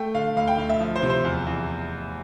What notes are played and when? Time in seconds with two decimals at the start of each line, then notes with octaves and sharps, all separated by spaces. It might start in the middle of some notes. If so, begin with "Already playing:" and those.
Already playing: A3 G5
0.15 D3 F5
0.37 D2 F5
0.48 G5
0.58 D2 F5
0.69 E5
0.80 F3
0.96 C5
1.02 C3
1.10 C5
1.25 E2
1.47 E2